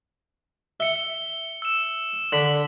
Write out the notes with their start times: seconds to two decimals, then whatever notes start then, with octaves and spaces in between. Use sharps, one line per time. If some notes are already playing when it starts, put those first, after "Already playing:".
0.80 E5 C#7 G7
1.62 E6 E7
2.33 D3 B6 F#7